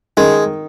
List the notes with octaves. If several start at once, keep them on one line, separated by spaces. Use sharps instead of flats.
D#3 G#3